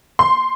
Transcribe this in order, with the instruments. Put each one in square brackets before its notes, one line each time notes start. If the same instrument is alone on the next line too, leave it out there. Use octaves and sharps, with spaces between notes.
[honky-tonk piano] C6